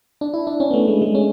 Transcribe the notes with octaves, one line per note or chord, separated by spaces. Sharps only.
D4
E4
D4
C#4
B3
A3
G#3
G#3
C#4